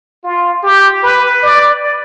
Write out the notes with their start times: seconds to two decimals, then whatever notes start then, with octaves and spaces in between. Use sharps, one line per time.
0.24 F4
0.63 G4
1.03 B4
1.43 D5